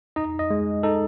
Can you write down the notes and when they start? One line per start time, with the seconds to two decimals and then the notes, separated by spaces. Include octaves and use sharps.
0.16 D#4 D#5
0.39 D#5
0.50 G#3
0.83 D#4 A4